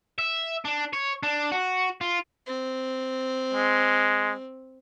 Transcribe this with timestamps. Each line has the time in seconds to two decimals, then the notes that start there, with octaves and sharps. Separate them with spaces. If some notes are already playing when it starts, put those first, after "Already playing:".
0.19 E5
0.65 D4
0.93 C#5
1.23 D4
1.52 F#4
2.01 F4
2.47 C4
3.53 G#3